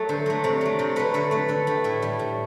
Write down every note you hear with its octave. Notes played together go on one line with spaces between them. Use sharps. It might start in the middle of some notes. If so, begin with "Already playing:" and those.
Already playing: F#3 A3 A4
D3 C5
F#3 A3
C3 D5
F#3 A3
C3 C5
F#3 A3 B4
D3 A4
A3 B4
D3 A4
A3 G4
A2 E4
G3
A2